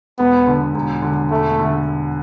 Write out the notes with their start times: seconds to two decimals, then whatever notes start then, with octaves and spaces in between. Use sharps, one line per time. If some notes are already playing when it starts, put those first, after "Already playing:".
0.19 E1 B3
0.47 D3
0.75 E1
1.02 D3
1.31 E1 A3
1.59 D3